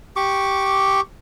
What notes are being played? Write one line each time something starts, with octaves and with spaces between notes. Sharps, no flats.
G4 C#6 D6